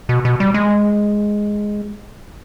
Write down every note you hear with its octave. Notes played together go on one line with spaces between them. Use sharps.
B2
B2
G3
G#3